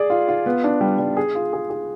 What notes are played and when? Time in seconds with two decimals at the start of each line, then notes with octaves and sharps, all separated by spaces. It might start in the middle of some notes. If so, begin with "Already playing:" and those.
Already playing: G#4 D5
0.10 F4
0.28 F4
0.46 B3
0.64 D4
0.81 G3
0.99 G3
1.17 G#4
1.35 F4
1.53 G#4
1.70 G#4